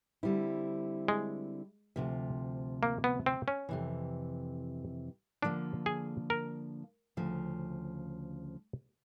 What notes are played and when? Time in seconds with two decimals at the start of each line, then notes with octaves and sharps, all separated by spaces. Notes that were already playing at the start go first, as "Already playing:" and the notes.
0.23 D3 G3 C4 E4
1.08 G#3
1.96 D2 C3 F3
2.83 A#3
3.04 B3
3.26 C4
3.48 C#4
3.69 F2 C3 E3
5.42 D3 F3 A#3 D4
5.86 G#4
6.30 A#4
7.17 D2 C#3 F3